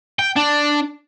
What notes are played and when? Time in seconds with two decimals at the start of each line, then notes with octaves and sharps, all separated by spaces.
0.19 G5
0.37 D4